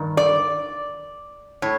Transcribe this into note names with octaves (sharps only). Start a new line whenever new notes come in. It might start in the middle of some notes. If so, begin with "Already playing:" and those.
Already playing: G2 D#3
D5
A2 C#5